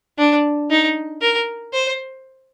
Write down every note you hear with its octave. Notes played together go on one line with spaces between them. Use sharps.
D4
D#4
A#4
C5